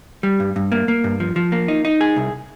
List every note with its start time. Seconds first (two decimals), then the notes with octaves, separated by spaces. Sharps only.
0.23 G3
0.40 G2
0.56 G2
0.72 A#3
0.88 A#3
1.04 G2
1.20 F3
1.36 F3
1.52 A#3
1.68 D#4
1.85 D#4
2.01 G#4
2.16 C2